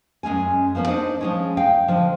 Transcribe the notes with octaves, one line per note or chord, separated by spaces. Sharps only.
F#2 G#3 C#4 G#5
F3 A#3 B3 C#4
D4 D#4 C5 D#5
F3 G#3 C#4
D#5 F5 G5
D3 F3